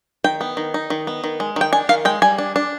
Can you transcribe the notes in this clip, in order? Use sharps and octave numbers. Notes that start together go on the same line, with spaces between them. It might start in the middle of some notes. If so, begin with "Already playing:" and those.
D#3 G5
B3
D#3
D#4
D#3
B3
D#3
G#3
D#3 G5
D4 G#5
D#3 F5
G#3 G5
G3 G#5
D4
D4